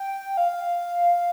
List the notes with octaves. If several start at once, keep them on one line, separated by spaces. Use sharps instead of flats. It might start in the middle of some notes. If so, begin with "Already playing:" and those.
Already playing: G5
F5